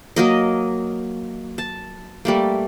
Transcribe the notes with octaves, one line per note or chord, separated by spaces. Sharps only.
F#3 A#3 D#5
A5
G3 A3 A#3